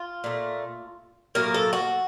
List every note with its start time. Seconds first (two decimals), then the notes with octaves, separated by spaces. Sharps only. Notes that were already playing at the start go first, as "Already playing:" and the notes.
Already playing: F4
0.24 A#2 A3
1.35 A2 F#3 A#3 A#4
1.54 A4
1.73 F#4